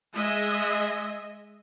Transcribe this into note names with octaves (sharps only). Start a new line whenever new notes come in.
G#3 D#5 E5